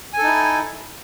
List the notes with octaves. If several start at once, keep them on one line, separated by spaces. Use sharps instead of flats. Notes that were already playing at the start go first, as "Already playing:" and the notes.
D#4 E4 A4 G#5